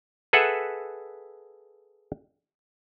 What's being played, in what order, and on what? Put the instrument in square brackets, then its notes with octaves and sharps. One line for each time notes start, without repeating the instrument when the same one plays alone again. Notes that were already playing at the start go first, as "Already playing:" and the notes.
[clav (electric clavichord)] G#4 A4 B4 E5 F#5